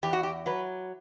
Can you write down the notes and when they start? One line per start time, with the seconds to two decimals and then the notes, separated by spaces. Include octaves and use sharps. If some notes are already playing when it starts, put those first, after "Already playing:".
0.03 E2 G4
0.13 F#4
0.23 G4
0.46 F#3 B4